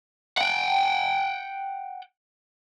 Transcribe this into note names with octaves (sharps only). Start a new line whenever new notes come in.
F#5 G5